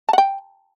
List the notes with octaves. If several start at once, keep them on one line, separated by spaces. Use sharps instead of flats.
F#5 G5 A5